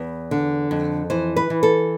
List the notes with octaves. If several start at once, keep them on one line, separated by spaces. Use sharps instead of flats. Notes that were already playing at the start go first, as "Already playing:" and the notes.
Already playing: E2 B4
D3
F2
E3 C5
B4
E3
A4